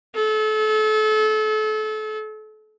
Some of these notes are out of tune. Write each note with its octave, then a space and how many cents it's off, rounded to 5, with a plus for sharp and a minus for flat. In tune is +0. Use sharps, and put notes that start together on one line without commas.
A4 -35